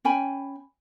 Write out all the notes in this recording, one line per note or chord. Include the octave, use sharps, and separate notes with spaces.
C#4 G5 G#5 B5